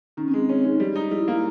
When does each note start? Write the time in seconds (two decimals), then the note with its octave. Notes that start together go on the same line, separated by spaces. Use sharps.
0.17 D#3 C#4
0.28 C4
0.34 G#3
0.49 C4 C#4
0.64 G#3 D#4
0.80 G3
0.96 D#4
1.11 G3 E4
1.28 A#3